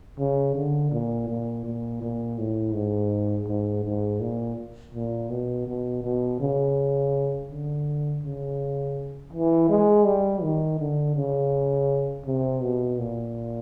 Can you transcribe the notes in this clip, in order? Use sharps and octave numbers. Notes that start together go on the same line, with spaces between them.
C#3
D3
A#2
A#2
A#2
A#2
A2
G#2
G#2
G#2
A#2
A#2
B2
B2
B2
C#3
D3
C#3
E3
G#3
G3
D#3
D3
C#3
C3
B2
A#2